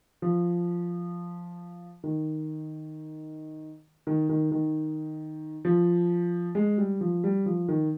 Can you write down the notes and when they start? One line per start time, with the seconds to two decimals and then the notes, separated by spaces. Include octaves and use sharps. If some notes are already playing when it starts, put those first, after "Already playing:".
0.22 F3
2.04 D#3
4.07 D#3
4.29 D#3
4.51 D#3
5.65 F3
6.55 G#3
6.78 G3
7.01 F3
7.24 G3
7.46 F3
7.68 D#3